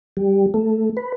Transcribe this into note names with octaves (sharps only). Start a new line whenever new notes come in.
G3
A3
B4